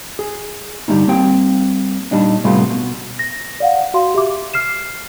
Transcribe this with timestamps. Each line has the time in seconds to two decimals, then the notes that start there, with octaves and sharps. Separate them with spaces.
0.19 G#4
0.88 G2 D3 G3 A3 C#4 D#4
1.08 G3 A#3 C4 G5
2.11 A#2 G3 D4 D#4
2.44 A2 C3 G3 A3 B3 F4
2.70 B2
3.19 A#6
3.60 D5 F5 F#5
3.94 F#4 F5 C6
4.15 G4 E5 D6
4.54 F6 C7 E7